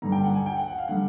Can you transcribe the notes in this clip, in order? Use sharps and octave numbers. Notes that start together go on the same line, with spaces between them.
G2 D3 G3 A#5
G5
F#5
G#5
G5
F#5
F#5
F5
D3 G3 F#5